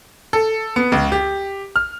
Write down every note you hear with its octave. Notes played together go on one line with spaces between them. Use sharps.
A4
B3
C#2
G4
F6